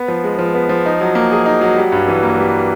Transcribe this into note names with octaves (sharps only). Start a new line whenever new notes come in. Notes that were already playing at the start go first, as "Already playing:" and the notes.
Already playing: B3
F3
G#3
F3
B3
F3
D#4
F#3
A#3
G#4
D#4
F#3
G3
G2
E3
A#3
G3